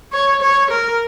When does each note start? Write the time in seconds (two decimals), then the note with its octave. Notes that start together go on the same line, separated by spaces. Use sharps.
0.13 C#5
0.42 C#5
0.71 A#4